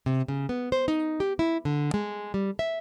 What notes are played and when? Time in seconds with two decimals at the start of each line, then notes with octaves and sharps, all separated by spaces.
0.06 C3
0.28 C#3
0.49 B3
0.72 C5
0.88 D#4
1.20 G4
1.39 E4
1.65 D3
1.94 G#3
2.34 G3
2.59 E5